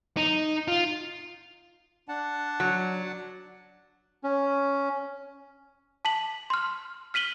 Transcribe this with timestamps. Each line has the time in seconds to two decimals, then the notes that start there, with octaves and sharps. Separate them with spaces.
0.17 D#4
0.68 F4
2.08 D4 F#5 A5
2.60 F#3
4.24 C#4
6.05 A5 B6 F#7
6.50 C6 F6
7.14 F6 B6 D#7 F#7 G7